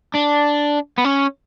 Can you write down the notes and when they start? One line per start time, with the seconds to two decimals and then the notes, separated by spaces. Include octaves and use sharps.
0.14 D4
0.98 B3
1.04 C#4